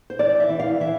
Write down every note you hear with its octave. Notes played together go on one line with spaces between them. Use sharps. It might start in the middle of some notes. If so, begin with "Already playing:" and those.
C5
E3 D5
E5
E3
F5
E3 E5